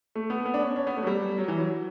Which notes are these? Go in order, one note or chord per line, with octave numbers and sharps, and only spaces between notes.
A3
B3
B3
D4
C#4
C#4
B3
A3
F#3
G3
F#3
E3
F#3